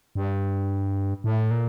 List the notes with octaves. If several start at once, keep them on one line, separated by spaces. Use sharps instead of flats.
G2
A2
A#2